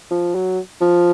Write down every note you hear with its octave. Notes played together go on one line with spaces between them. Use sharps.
F3
F#3
F3